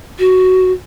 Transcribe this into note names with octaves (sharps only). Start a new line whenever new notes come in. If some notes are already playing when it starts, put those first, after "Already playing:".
F#4